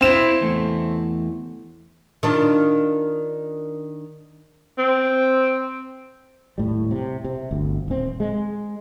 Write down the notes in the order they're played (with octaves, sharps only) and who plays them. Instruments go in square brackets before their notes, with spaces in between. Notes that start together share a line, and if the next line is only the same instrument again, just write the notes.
[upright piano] C4 E7 [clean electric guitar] E4 F5
[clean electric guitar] E2 A3
[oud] D#3 D4 F4
[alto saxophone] C4
[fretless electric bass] D#1 A2 G3
C3
C3
G1 D2
D#1 C4
G#3